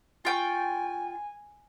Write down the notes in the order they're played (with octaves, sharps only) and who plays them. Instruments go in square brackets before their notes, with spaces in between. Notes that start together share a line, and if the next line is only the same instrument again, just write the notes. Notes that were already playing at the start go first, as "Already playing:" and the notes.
[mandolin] F4 G5 C#6 [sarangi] G#5